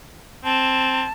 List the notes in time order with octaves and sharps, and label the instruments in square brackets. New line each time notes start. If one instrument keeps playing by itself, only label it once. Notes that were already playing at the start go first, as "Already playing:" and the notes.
[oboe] C4 [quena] A5